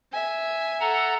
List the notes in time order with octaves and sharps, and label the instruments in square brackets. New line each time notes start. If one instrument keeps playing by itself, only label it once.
[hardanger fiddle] E5 G#5
[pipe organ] A4 F#5 A#5